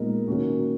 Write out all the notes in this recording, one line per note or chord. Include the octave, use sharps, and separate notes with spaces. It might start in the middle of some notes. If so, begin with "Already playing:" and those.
Already playing: A#2 G#3 B3 D#4 A#4
D#3 A#3 C#4 F#4